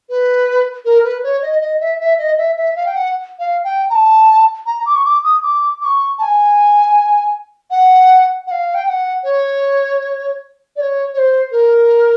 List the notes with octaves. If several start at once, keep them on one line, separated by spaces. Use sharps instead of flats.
B4
A#4
B4
C#5
D#5
D#5
E5
E5
D#5
E5
E5
F5
G5
F#5
F5
G5
A#5
A5
A#5
D6
C#6
D6
D#6
D6
D6
C#6
A5
G#5
F#5
F#5
F5
G5
G5
F#5
C#5
D5
C#5
C#5
C5
A#4